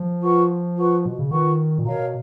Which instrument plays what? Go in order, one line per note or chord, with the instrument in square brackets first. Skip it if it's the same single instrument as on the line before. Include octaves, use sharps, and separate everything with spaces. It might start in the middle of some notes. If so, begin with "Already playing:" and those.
Already playing: [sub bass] F3
[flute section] F4 B4 F#5 C#6
F4 B4 F#5 C#6
[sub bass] B2
C#3
[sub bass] D#3 [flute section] F4 B4 F#5 C#6
[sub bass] A#2
[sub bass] B2 [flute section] A#4 C#5 F5 A#5